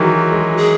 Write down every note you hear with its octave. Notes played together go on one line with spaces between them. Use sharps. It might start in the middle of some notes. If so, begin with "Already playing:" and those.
Already playing: D#3 E3 F#3 G#3 F#4
G#3
G#4